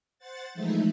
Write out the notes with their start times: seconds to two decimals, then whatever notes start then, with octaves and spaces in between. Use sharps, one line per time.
0.19 C5 F#5 A6
0.54 E3 F3 G#3 A3 D#4 E4